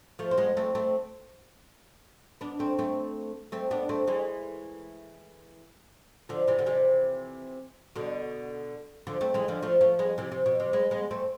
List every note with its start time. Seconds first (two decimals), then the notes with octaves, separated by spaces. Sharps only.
0.19 F3 A3
0.31 C4
0.38 G#3 B3
0.57 A3 C4
0.75 A3 C4
2.41 B3 D4
2.59 A3 C4
2.79 A3 C4
3.52 A3 C4
3.71 B3 D4
3.89 A3 C4
4.07 E3 G#3
6.29 D3 F3
6.48 C3 E3
6.59 D3
6.66 C3 E3
7.96 B2 D3
9.07 D3 F3
9.21 A3 C4
9.34 E3 G#3
9.48 D3 F3
9.62 F3 A3
9.81 F3 A3
9.99 G#3 B3
10.18 C3 E3
10.32 C3
10.46 B2
10.60 C3
10.73 G#3 B3
10.91 G#3 B3
11.11 A3 C4